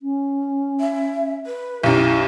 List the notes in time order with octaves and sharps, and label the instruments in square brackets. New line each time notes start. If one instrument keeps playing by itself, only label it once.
[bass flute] C#4
[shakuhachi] E5
B4
[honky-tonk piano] B1 F#2 [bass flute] E4 [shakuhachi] G4